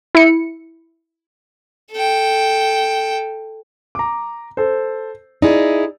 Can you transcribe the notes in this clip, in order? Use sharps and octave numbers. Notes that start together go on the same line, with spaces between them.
E4 C#7
A4 G5
A#5 D6
A4 C5
D#4 E4 G#4 D5